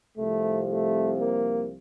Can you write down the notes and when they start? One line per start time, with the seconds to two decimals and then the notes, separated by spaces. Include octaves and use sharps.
0.17 C2 C3 F3 A3
0.68 A3
1.19 A#3